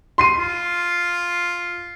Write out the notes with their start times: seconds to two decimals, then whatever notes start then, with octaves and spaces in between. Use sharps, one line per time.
0.18 C6 C7 D#7
0.38 F4